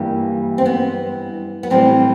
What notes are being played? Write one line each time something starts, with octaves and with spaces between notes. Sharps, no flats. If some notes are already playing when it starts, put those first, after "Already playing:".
Already playing: G2 E3 G3 A#3
C4
B3
B3
A2 E3 G3 C4